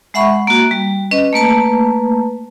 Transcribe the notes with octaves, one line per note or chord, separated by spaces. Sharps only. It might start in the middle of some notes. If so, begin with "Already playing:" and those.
G#3 E5 F#5 B5 C#6
A#3 F#4
G3
C#4 B4 D#5
A3 A#3 B4 A5